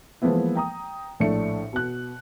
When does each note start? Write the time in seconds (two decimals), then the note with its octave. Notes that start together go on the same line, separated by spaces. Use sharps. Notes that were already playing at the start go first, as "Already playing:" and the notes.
0.22 E3 F3 G#3 A#3 B3 E4
0.55 G5 A#5 D#6
1.20 A#1 A2 A3 D4 C#7
1.73 B2 F#6